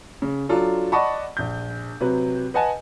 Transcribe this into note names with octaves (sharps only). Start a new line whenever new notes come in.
C#3
F#3 D4 F4 A4
D5 D#5 F#5 A5 B5 C#6
A#1 G6
C3 F#3 B4
B4 D#5 F#5 G#5 A5